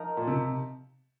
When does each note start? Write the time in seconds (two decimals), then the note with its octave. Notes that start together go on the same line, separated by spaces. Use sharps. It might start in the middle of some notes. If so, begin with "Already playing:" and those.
Already playing: F3 D#4 A#4
0.17 A#2
0.27 C3